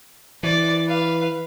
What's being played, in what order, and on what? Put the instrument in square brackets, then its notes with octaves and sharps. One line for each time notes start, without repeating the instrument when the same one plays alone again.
[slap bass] E3 [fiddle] D5
[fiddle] B4 F5